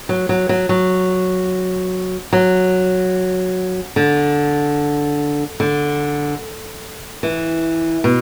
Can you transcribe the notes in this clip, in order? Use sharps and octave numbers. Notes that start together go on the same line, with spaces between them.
F#3
F#3
F#3
F#3
F#3
D3
D3
E3
B2